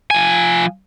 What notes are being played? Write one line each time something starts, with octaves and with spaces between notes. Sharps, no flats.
F3 G#5